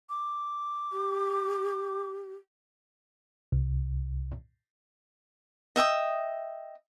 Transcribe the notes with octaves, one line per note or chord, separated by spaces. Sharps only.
D6
G4
C2
D#5 E5 G5 D#6